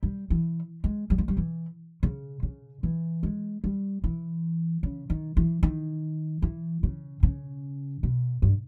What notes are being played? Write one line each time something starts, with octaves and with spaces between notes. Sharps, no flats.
G3
E3
G#3
G3
G#3
G3
E3
C#3
C#3
E3
G#3
G3
E3
C#3
D#3
E3
D#3
E3
C#3
C#3
B2
G2